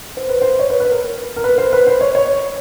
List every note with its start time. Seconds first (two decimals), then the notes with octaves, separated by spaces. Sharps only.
0.17 C5
0.29 B4
0.42 C5
0.59 C#5
0.70 B4
0.80 B4
0.92 A#4
1.36 A#4
1.44 B4
1.58 C5
1.73 B4
1.87 C5
2.01 C#5
2.15 C#5